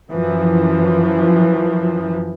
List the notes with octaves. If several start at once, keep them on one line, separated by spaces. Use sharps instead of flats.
F#2 E3 F3